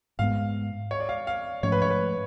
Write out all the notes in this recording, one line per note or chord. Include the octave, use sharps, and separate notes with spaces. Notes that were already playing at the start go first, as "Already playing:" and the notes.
G#2 G#3 B3 F5
C#5
D5
F5
F5
G#2 F3 A3 C#4 C#5
B4
C#5
B4